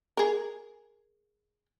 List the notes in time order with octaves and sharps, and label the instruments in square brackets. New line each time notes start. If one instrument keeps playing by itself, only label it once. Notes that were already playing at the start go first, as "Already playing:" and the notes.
[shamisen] G#4 A#4